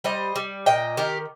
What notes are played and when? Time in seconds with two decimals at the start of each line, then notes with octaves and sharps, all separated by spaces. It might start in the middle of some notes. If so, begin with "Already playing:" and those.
0.04 G3 C5 D#5
0.36 G3
0.66 A#2 D#5 G5
0.97 D#3 G4 A#4